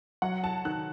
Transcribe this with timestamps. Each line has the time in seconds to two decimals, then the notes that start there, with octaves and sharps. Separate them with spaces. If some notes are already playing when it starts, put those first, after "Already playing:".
0.22 F#3 F#5
0.44 A5
0.65 D#3 F#6